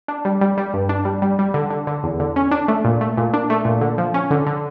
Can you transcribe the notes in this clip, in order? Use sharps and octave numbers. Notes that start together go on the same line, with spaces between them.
D4
G3
G3
G3
G2
D4
G3
G3
G3
D3
D3
D3
E2
D3
C#4
D4
A3
A#2
A3
A#2
D4
A3
A#2
D3
F3
C#4
D3
D3